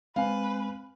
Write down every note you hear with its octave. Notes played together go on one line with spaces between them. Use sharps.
G#3 C4 B4 F5 G#5